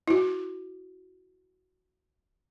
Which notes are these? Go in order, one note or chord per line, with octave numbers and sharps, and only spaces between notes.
E4 F#4